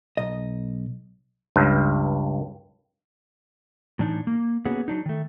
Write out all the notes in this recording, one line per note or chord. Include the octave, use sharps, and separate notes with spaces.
B1 D#5
C#2 G2
A2 E3 D4 D#4
A#3
A#3 B3 C#4 F#4 G#4
F#3 D4 D#4
D#3 A3